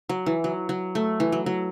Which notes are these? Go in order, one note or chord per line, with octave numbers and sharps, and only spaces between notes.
F#3
E3
F#3
F#3
A3
E3
F#3
F#3